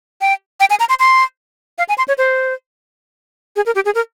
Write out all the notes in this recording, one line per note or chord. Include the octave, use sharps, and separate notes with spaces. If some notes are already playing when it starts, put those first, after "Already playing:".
G5
G5
G#5
A#5
C6
C6
F5
G#5
C6
C#5
C5
G#4
A#4
G4
G#4
A#4